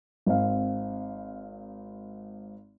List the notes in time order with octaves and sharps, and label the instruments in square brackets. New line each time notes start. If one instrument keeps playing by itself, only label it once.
[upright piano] G#1 C4 F5